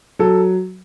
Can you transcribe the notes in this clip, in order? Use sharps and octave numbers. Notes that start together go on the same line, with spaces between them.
F#3 A4